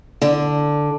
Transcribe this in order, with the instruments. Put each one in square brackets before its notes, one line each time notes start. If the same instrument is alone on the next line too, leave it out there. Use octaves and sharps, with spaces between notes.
[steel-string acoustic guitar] D3